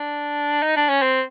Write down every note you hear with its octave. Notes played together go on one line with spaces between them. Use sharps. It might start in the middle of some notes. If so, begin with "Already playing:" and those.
Already playing: D4
D#4
D4
C#4
C4